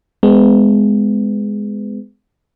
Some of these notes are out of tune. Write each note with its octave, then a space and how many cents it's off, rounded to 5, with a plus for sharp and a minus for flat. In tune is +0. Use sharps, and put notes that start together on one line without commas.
G#3 +0 B3 +35